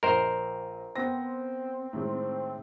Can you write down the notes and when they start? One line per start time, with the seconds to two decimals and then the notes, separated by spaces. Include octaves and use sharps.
0.03 A#1 A#4 C5 D#5 G5
0.96 B3 C4 A#6
1.93 A2 D#3 G#3